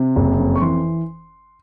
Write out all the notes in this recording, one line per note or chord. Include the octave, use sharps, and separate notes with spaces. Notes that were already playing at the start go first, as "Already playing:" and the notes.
Already playing: C3
F#1
F2
C#6
E3 C6